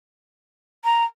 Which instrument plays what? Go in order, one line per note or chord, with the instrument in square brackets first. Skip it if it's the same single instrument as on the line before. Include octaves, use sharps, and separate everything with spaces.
[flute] A#5